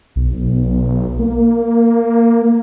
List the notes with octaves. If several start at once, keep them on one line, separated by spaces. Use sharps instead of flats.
B1
A#3